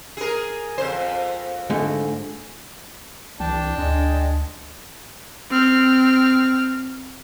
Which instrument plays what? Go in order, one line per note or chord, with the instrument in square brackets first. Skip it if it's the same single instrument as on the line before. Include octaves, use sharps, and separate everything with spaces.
[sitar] G#4 A#4
F2 C5
[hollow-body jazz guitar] G#2 D3 A3
[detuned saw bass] C2 [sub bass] E3 [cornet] D4 [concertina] G5 A5
[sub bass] D2 [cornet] G#3 [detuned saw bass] D4
[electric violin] C4 F6